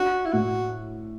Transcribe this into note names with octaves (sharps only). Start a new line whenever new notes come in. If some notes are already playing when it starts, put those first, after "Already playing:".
Already playing: D4 F#4
E4
A2 F#4